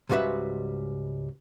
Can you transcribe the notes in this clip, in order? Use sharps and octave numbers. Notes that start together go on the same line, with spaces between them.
C#2 G#2 G3 F#4 B4 E5